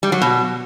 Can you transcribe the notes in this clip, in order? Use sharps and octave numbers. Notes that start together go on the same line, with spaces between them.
G3
F#3
B2